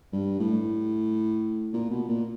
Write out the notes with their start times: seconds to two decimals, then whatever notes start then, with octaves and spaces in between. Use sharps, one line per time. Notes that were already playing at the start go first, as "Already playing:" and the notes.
0.13 G2
0.40 A2
1.73 A#2
1.90 B2
2.09 A#2